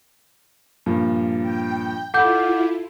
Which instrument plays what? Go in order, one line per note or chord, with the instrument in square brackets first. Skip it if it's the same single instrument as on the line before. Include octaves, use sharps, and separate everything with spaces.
[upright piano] G2 A#2 F3
[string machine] G5
[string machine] E4 F4 [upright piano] A4 B5 [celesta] F#5 D6 G6